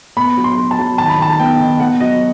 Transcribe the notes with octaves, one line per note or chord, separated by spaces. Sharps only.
B3 B5
F#3
C6
F#3
A5
F#3
D#3 A5
B5
D#3 A5
B3 G5
D#3
B3 F#5
F#3 D#5